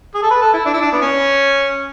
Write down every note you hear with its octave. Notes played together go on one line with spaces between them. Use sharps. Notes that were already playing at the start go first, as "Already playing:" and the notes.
G#4
A4
B4
A4
E4
D4
E4
D4
B3
C#4